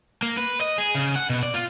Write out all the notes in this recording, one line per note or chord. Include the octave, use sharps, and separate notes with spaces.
A#3
B4
D#5
G#4
C#3
F#5
B2
D5
F4